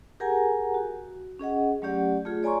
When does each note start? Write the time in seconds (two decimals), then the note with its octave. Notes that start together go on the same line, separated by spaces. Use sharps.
0.20 G4 G#4 A#4 F#5 G#5 A#5
0.74 F#4
1.39 C#4 G#4 D#5 F#5
1.82 F#3 A3 C#4 G4 D5 F#5
2.25 A3 F4 G#4
2.43 C#5 D5 G#5 A#5 C6 C#6